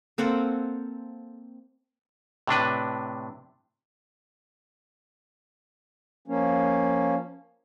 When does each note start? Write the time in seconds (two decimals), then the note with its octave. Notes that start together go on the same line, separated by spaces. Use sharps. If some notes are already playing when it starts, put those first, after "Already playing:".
0.18 A#3 C4 A4 F#5
2.47 A2 C3 D4 B4
6.28 F3 A#3 C#4